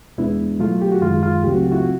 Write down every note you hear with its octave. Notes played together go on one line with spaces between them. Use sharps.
E2 B2 G#3 B3 D4 E4
B2 F#3 A3 F4
G4
F#4
F#2 D#3 G#3 F4
F4
C#2 C#3 F#3 A3 C4 G4
F#4
F4
E4 F#4